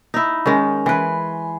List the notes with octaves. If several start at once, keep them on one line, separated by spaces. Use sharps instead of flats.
D#4 E4
D#3 G#3 C#4
E3 B4 G#5 C6